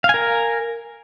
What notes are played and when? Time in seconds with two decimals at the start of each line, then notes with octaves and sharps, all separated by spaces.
0.04 F5
0.09 G#5
0.14 A#4